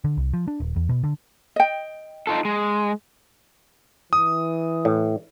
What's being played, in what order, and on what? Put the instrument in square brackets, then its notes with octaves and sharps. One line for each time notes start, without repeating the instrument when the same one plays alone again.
[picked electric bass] D3
C2
F3
D4
D#1
E2
B2
D3
[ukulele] D#5 G5
[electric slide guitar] D#4 F4 A4
G#3
[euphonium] E3 [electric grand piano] D#6
[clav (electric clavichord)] A2